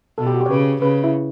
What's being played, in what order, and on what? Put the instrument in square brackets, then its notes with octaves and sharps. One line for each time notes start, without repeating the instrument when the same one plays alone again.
[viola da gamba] B2 [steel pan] A4
[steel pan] G4
F#4
G4
C#5
[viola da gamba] C#3 [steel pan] B4
[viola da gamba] C#3 [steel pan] B4
[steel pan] E4